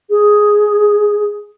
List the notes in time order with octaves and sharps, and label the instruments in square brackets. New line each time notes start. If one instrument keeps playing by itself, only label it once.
[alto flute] G#4